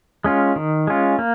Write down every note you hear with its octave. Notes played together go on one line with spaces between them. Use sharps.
G#3 C#4 F4
D#3
G#3 C#4 F4
A#3